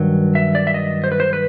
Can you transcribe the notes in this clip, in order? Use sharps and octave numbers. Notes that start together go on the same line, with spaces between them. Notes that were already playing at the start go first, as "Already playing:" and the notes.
Already playing: G2 D#3 F#3
E5
D5
E5
D#5
C5
B4
C5
B4